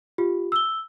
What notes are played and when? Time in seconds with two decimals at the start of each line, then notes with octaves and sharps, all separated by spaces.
0.18 F4 G4
0.52 E6 G7